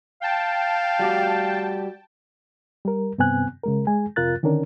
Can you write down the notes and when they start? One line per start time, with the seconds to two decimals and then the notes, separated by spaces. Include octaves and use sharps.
0.22 F5 G5 A5
0.99 G3 F#4 G4
2.85 G3 A#4
3.18 G2 C3 B3 C4 G#5 F#6
3.64 C#3 G#3 A#4
3.87 G#3 G#4 G#5
4.16 F2 C3 F4 A#4 F#6 A6
4.43 D3 D#3 C#4 D4 A#4